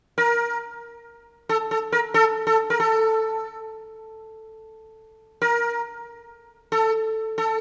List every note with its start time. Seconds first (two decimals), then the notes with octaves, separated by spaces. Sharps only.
0.18 A#4
1.49 A4
1.71 A4
1.92 A#4
2.14 A4
2.47 A4
2.70 A#4
2.80 A4
5.42 A#4
6.72 A4
7.38 A4